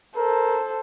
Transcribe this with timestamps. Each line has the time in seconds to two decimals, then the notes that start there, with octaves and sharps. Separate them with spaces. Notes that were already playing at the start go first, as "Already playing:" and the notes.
0.16 A4 A#4 C5